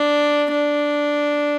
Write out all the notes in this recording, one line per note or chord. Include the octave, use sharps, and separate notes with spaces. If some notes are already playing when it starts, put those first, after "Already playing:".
Already playing: D4
D4